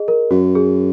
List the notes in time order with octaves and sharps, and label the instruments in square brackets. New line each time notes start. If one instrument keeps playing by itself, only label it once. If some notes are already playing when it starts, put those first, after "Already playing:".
Already playing: [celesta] G#4 D#5
A#4
[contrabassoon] F#2 [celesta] F#4
[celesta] G#4